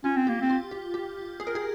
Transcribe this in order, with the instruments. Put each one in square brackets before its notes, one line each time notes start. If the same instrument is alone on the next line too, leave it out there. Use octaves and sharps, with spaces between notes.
[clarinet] C#4 [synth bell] F4
[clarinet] C4
[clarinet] A#3 [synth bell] G4
[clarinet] C4
[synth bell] F4
G4
G4
G#4
A#4
G#4